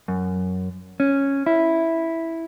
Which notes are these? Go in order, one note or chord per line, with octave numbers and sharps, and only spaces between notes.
F#2
C#4
E4